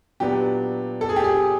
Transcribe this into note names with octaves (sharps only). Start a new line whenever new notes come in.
A#2 F#3 B3 D4 G4
A4
G#4
G4
G#4